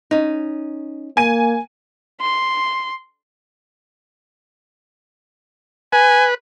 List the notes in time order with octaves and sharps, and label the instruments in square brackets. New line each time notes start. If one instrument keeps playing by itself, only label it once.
[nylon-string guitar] C#4 D#4
[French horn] A#3 [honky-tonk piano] G#5 D#7
[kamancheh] C6
[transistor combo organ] B4 [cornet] G#5